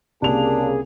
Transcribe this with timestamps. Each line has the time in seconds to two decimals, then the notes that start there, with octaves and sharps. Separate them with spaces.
0.22 C2 C#3 A#3 D4 G#4 F7